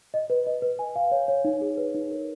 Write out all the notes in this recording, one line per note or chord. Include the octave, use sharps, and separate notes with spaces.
D#5
B4
D#5
B4
G#5
F5
C#5
C#5
D#4
G#4
B4
D#4
A#4